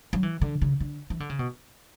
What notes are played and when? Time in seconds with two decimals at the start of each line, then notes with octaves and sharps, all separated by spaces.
0.13 F#3
0.23 E3
0.41 D3
0.62 C#3
0.80 D3
1.10 E3
1.20 D3
1.30 C#3
1.39 B2